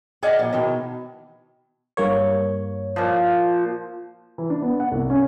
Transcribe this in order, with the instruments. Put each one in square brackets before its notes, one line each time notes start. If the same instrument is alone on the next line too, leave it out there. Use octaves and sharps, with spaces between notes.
[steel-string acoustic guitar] G#4 D5 D#5 F5 F#5 G#5
A#2 F3
B2 D#3 E3
[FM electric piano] G2 A#3 C#5
[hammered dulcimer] A#2 F3
[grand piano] E3
D4
B3
F#5
C2
C#4